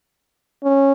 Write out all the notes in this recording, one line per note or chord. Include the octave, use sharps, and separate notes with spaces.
C#4